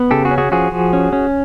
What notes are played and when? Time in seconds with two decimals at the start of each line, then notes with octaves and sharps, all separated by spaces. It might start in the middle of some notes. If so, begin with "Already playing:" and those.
Already playing: B3
0.11 C#3 G4 A4
0.25 F#4 G#4
0.31 C#4
0.38 F#4 G#4
0.52 F3 F#4 G#4
0.72 F3
0.93 C#4
1.13 C#4